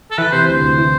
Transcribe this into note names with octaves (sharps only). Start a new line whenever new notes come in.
A4
E3 B4
C3 C5
D2 C5
D2
E3